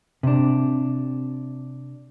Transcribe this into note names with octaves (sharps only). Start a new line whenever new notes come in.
C3 D4